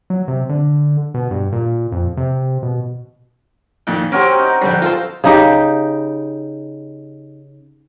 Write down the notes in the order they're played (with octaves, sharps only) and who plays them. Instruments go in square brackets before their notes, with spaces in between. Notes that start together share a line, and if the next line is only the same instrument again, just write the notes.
[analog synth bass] F#3
C3
D3
B2
G2
A#2
F2
C3
B2
[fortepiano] F2 A#2 D#3
[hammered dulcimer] C4 F#4 A#4 [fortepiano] C#4 G4
[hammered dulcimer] D#4
[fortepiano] A#1 D3 G3
F4 A4 C5
[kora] C#3 D#4 G4